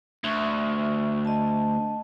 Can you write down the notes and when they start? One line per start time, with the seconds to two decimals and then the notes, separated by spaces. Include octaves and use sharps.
0.24 D2 E5 C#6
1.25 D#5 A5